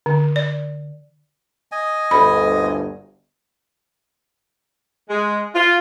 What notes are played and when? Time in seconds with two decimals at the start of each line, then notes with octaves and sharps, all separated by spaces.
0.06 D3
0.36 D5
1.72 D#5 G#5
2.11 G1 D2 B5
5.09 G#3
5.55 F4